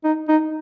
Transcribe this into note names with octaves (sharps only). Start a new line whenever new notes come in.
D#4
D#4